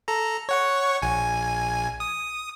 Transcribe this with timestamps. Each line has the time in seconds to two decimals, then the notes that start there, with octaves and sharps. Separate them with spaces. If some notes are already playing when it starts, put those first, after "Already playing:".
0.08 A4 A#5
0.49 C#5 F#5 C#6
1.02 A#1 G#5
2.00 D#6